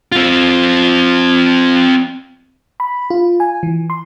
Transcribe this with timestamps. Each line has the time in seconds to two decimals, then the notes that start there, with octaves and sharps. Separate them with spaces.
0.12 C4 F4
2.80 B5
3.10 F4
3.40 G#5
3.63 E3
3.90 C6